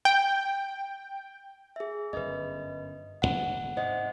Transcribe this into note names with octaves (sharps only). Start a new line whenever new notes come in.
G5
G#4 E5
G1 F#2 B4 D#5
D1 G1 F#5
G#2 C3 C5 D#5 F#5